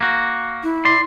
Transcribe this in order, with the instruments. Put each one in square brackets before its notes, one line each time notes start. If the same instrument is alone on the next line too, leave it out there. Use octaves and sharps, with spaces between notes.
[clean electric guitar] A#3 F#4
[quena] E4
[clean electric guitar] D5 C6